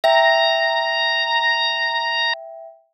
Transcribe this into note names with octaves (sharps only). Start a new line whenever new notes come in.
E5 G5 A#5 A#6